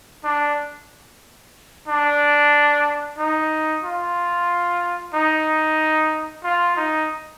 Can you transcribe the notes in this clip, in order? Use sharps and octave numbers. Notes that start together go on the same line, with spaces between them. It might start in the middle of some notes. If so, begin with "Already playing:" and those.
D4
D4
D#4
F4
D#4
F4
D#4